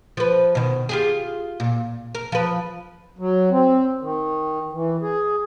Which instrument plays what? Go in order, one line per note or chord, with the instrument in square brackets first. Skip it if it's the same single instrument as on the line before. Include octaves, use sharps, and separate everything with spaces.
[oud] F3 B4
B2 D#3
F4 G4 G#4
A#2
A#4
F3 B4
[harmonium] F#3
C4
D#3
E3
G#4